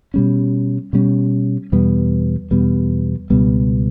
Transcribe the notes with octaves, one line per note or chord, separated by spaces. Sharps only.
B2 G3 C#4
B2 G3 C#4
E2 B2 G3 B3
E2 B2 G3 B3
C#2 B2 G3 B3